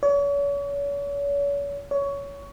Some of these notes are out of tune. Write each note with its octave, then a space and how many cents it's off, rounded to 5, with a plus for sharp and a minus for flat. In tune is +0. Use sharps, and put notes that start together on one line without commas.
C#5 +40
C#5 +20